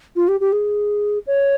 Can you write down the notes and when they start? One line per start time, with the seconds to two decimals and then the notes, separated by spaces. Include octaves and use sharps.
0.16 F4
0.28 G4
0.40 G4
0.52 G#4
1.27 C#5